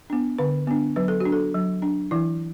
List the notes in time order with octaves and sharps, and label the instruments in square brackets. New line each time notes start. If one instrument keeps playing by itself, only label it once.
[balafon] B3 D4
D3 B4
B3 D4
F#3 B4
A4
F#4
D4
A4
F#3
D4
E3 E4